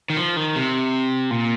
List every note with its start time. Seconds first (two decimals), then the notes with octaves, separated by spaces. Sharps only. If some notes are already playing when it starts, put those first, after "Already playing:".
0.10 D#3
0.17 F3
0.36 D#3
0.56 C3
1.31 A#2